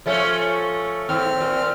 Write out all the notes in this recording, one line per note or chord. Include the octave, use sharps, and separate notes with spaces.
F3 A3 C#4
D#2 A2 C4 F6
A#2